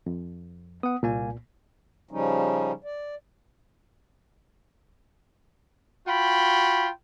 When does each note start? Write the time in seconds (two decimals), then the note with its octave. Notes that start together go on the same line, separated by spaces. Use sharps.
0.06 F2
0.83 B3 F#5 D#6
1.03 C2 A#2 A#3 G#5
2.11 C#3 F3 G3 C#4 D#4
2.84 D5
6.07 F4 F#4 G5 B5